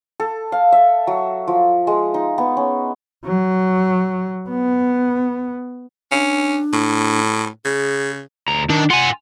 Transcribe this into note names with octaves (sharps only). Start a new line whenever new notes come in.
A4
F5
E5
F#3
F3
G#3
D#4
B3
C#4
F#3
B3
C#4 D4
A2
C#3 G#4
D2 A#5
D#3 D4
F4 F#5 G#5